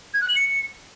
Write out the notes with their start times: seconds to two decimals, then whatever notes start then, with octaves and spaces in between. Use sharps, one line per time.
0.14 G#6
0.21 F#6
0.28 F#7
0.36 C#7